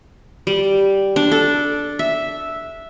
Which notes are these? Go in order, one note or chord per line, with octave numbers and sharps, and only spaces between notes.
G3
D4
A4
E5